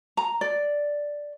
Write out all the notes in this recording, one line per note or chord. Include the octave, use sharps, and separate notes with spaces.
A#5
D5